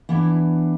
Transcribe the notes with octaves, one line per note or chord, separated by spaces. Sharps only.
E3 B3 D4 E4